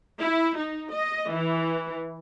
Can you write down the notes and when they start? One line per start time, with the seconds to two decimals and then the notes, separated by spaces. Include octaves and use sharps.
0.20 E4
0.57 D#4
0.92 D#5
1.31 E3